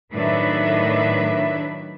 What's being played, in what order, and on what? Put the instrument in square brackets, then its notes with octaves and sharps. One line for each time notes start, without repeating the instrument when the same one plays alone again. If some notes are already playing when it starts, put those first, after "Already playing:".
[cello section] A2 D#3 F#3 D4 B4 E5